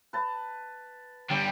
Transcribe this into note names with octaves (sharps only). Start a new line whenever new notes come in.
B4 A5
D3 G3 G4 D5 G5